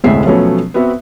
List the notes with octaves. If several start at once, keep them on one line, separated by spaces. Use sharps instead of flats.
F1 D2 A2 G#3 E5 C7
B2 F3 F#3 A3 B3 C#4
B3 C4 F#4 E5